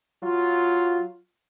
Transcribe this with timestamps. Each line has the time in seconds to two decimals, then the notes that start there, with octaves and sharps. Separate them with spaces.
0.23 F#3 F4